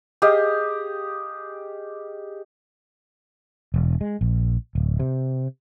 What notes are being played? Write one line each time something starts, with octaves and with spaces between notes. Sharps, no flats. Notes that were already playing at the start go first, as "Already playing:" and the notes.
G4 G#4 D#5 F5
E1
G#3
A#1
D1
C3